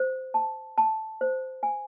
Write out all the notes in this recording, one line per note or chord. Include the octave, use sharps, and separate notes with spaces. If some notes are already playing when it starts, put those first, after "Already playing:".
Already playing: C5
A5
A5
C5
G#5